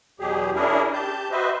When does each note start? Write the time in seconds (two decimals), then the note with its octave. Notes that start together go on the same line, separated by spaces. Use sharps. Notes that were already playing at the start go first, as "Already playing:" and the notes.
0.20 E2 B2 F#3 G4 G#4
0.55 C#4 D4 E4 G#4 A#4
0.93 G4 A5 G6
1.31 F#4 B4 C5 D#5 E5